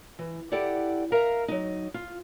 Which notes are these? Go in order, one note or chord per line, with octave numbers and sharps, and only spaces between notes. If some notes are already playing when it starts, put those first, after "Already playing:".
E3
E4 G4 A4 D5 F#5
A#4 E5 F5 A#5
F#3 D#4
F4